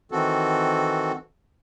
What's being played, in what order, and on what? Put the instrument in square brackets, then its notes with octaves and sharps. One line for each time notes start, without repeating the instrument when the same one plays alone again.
[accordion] D#3 E3 C4 F#4 A4